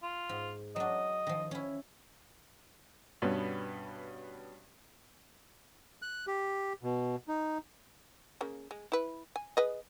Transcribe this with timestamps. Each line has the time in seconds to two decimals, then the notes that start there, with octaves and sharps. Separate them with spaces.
0.03 F4
0.29 G#2
0.76 F#3 D4 D#5
1.27 D#3 F3
1.51 C#4 E4
3.22 G2 B2 B3 C#4
6.02 F#6
6.27 G4
6.83 B2
7.28 D#4
8.41 C#3 A#3
8.71 G#3
8.92 E4 B4
9.36 G#5
9.57 G#4 B4 D#5